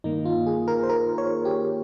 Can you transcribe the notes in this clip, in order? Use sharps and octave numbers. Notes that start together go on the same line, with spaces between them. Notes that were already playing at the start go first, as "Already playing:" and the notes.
G2 D#3 A#3 D#4
F4
G#4
A#4
C5
A#4
C#5
G4